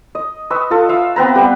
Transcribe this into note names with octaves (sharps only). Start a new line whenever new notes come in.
D#5
B4 D#5 C#6 E6
F4 A4
E5 F5 E6
B3 C4 B4 A#5
G3 B3 B5